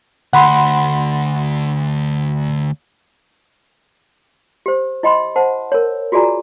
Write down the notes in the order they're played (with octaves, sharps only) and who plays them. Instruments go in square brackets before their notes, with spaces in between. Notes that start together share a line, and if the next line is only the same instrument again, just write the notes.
[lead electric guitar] D2 [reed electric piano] F#5 B5 C6
[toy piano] G4 C5
E4 D#5 G5 B5 C6
C5 F#5 A5
A#4 C#5
F4 F#4 G#4 D5 G#5 A#5